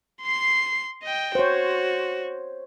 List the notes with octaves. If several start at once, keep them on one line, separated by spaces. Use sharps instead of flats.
C6 C7
D#5 G5
F#4 C5 C#5